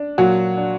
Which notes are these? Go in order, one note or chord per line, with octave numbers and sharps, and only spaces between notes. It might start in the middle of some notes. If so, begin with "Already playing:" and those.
Already playing: D4
A#2 F#3 F#4
D4